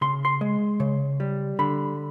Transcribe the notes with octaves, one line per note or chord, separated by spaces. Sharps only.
C#3 C6
C6
G#3
C#3
G3
D3 B5